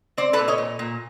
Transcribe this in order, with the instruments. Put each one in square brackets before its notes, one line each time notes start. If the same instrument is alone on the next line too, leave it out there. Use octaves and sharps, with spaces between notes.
[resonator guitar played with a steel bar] C4 C5 D5
A4 B4
A#2
C#5 D#5
A#2
A#2